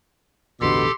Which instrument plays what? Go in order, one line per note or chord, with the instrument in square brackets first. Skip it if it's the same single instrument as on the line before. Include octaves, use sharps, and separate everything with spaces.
[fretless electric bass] E1 A1 D3 [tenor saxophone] B2 [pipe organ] G4 A4 [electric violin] C6